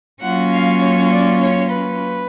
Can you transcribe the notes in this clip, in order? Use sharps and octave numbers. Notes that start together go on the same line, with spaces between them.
F#3 A#3 C#4 F4 F#5
F5
C#5
D5
C#5
B4